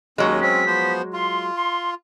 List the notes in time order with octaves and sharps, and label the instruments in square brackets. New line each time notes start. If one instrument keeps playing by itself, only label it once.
[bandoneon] D#2 C#4 [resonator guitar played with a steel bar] F#3 G#3
[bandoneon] C4 C#4 [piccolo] B6
[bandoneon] F3 B3 C5
[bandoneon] F4 [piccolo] C6
[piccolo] C6